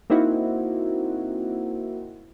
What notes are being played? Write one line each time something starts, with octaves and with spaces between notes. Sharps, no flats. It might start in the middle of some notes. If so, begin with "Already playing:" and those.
A#3 C4 D#4 E4 F#4